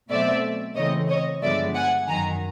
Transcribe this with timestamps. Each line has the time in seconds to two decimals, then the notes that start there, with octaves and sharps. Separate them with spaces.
0.10 B2 F#3 A3 C4 D5 E5
0.76 C#3 E3 A3 C4 C#5 D#5
1.09 C#5 D#5
1.42 G2 D3 F3 G#3 B3 D5 E5
1.75 F#5 G#5
2.08 F#2 D#3 F#3 G#5 A#5